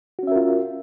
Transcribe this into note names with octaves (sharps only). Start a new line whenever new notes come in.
C#4 F4 F#4 A#4 E5